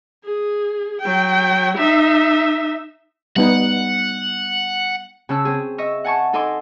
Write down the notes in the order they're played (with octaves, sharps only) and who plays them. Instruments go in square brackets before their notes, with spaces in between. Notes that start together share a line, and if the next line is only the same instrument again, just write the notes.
[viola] G#4
F#3 G5
D#4 E5
[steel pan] G3 B3 D#4 [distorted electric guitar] F#5
[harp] C#3 C#4 A5 E6 F#6
C4 G#4
D#5 E5 C#6
F#5 G#5 A5 C#6
D#4 A4 D#5 G#5 C6 D6